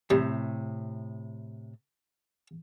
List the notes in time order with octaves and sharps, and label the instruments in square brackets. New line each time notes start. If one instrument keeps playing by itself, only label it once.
[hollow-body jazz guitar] A2 C3 [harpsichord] G3